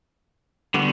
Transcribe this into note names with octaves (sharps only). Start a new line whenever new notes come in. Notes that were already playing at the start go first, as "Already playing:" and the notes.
D3 G3 B3 F#4